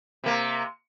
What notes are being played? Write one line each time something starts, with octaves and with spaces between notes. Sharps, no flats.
C3 A#3